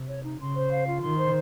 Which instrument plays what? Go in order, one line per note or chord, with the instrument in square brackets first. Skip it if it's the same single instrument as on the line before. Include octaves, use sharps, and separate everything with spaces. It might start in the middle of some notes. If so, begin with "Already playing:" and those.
Already playing: [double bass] C3
[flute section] C#5
D#4
[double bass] C#3 [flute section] C6
[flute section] C5
F5
F4
[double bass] D#3 [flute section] C6
[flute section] C5